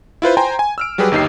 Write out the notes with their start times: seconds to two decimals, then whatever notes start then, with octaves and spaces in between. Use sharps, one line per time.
0.22 E4 F4 B4 C5
0.37 C5 G5 G#5 A#5 C6
0.59 G#5
0.78 E6 F6 D7
0.98 F#3 G3 G4 G#4 B4
1.11 G1 D#2 D#4 G4 C7